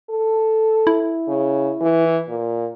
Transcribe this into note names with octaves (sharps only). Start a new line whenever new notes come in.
A4
E4
C#3
E3
A#2